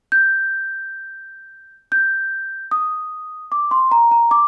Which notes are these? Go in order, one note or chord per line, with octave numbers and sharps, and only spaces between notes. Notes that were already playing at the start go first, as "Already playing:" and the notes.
G6
G6
D#6
D6
C6
A#5
A#5
D6